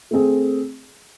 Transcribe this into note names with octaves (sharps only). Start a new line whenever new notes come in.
A3 C4 G#4